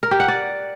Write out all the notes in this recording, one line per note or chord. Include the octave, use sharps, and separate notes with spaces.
A#4
G4
F#5
D5